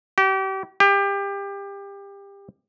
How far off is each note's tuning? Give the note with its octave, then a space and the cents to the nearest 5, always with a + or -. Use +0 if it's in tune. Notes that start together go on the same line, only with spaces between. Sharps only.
G4 -35
G4 +25